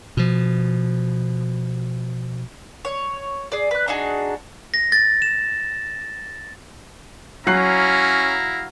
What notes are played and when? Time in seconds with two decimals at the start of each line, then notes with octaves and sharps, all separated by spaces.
0.17 B2 F3
2.85 C#5
3.52 G#4 D5
3.71 B4 F#6
3.88 D4 D#4 F#4 G#4
4.74 A#6
4.92 A6
5.22 E7
7.47 F#3 C#4 E4 F5 A#5 F#6 C7